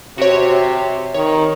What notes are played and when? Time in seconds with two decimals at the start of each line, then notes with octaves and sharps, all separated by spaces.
0.18 C3 F#4 G4 C#5
1.14 D#3 C#5